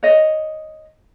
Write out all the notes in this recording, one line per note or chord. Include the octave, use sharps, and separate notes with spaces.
C#5 D#5